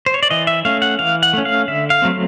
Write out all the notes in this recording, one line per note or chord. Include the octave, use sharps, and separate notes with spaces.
C5
C#5
D5
E3 D#5
E5
A3 C#4 F5
F#5
E3 F5
F#5
A3 C#4
F5
D3 E5
F5
F#3 A3 C4